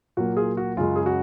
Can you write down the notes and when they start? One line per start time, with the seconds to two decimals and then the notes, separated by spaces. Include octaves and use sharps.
0.17 A#2 F#3 A#3 F#4
0.37 F4 G#4
0.57 F#4
0.77 F#2 C#3 G#3 F4
0.96 G#4
1.06 F#4